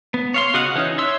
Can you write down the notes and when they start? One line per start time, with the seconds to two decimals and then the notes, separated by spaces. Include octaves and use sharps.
0.14 B3
0.34 C#5 F5 C6
0.54 C#3 F#4 D#5 F5 F#5
0.75 E3 C#4 D#4
0.98 C#5 E5 C6 E6